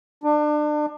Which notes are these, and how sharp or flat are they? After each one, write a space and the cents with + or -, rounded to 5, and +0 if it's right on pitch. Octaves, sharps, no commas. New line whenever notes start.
D4 +30